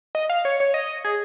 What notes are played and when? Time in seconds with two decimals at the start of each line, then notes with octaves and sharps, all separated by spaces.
0.15 D#5
0.30 F5
0.45 C#5
0.60 C#5
0.74 D#5
1.04 G#4